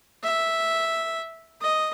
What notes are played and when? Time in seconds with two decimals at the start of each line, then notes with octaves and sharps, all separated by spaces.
0.24 E5
1.61 D#5